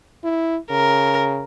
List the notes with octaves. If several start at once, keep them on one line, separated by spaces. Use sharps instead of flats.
E4
C#3 A#4